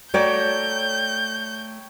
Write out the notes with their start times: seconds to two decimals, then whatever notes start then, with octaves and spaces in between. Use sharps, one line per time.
0.14 A3 F#4 C#5 D5 G5 A#5 G6